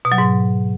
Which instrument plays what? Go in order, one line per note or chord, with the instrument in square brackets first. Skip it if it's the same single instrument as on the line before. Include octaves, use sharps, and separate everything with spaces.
[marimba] B2
F#3
G#2